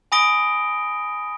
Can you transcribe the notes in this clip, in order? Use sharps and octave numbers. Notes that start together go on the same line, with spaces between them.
G#5 B5 D#6 A#6 D7 G7